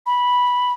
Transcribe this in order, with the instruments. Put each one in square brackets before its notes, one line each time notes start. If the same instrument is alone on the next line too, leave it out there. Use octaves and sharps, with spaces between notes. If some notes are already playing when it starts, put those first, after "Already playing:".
[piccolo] B5